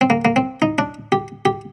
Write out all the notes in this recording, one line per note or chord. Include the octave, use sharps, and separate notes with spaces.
C4
A#3
A#3
C4
D#4
D4
G4
G4